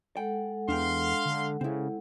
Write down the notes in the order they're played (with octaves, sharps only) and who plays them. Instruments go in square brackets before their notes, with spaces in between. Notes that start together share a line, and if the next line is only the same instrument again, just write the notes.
[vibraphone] G#3 A4 F#5 [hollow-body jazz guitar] G5
[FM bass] E2 [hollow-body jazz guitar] D4 G5 [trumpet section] F5 C6
[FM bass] D3
[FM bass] C#3 [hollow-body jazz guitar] C4 E4